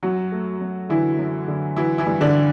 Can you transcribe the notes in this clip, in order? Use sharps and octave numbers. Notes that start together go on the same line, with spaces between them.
F#2 F#3 F#4
A3
F#2
D3 E3 E4
F#2
D3
E3 F#3 E4
E3 E4
G2
D3 D4